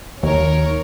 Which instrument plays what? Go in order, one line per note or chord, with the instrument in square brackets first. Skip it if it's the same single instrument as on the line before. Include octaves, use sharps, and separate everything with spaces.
[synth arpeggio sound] D#2 [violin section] A#4 C#5